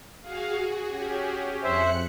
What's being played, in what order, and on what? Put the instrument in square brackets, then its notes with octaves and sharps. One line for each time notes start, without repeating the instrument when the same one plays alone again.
[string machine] F#4 G#4 [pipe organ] F5
[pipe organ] C#4 G4
[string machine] F2 F#6 C#7 [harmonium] C5 E5